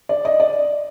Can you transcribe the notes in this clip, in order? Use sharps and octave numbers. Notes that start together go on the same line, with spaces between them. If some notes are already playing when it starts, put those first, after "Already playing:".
D5
D#5
D5